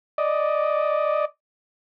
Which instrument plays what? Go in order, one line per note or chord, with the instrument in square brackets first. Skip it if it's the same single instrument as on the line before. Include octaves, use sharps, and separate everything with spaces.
[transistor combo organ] D5 D#5